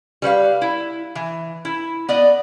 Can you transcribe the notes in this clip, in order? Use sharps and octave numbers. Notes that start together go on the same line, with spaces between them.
G3 B4 C#5 F5
E4
E3
E4
B3 D5 D#5